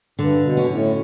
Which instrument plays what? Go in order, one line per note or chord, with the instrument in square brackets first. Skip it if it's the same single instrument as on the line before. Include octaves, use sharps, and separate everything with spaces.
[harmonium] G2 [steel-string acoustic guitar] D3
[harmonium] B2
[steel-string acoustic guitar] C#4
[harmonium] A2